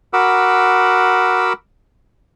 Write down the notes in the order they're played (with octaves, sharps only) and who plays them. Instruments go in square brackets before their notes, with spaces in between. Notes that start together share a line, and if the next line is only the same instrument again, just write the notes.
[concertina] F#4 A#4 F#5 B5 D6 E6